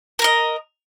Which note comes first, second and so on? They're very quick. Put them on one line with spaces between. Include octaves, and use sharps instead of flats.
A#4 A#5 D#5